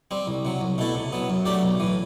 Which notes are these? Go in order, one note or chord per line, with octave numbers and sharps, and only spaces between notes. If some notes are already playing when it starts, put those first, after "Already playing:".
G3 C4
C2
C3 F#3
C2
B2 A3 E4 A4
C3
F#3 B3
F#2
F#3 A3 D4 G4
B1
A2 E3